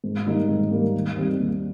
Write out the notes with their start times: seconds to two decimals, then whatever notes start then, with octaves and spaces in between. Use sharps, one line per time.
0.04 G#2
0.26 D#3 G3 A#3 D#4
0.48 G#2
0.71 D#3 G3 A#3 D#4
0.94 D#2
1.17 D#3 G3 C4
1.39 D#2